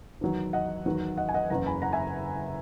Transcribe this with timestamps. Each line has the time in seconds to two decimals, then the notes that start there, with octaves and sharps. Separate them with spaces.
0.21 E2 D#3 F#3
0.53 D#5 F#5
0.86 E2 D#3 F#3
1.17 D#5 F#5
1.29 G#5
1.34 D#5 F#5
1.50 F#1 E2 C#3 F#5 A#5
1.66 G#5 B5
1.82 F#5 A#5
1.93 E5 G#5